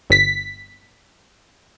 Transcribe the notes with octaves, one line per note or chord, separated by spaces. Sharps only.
G1 B6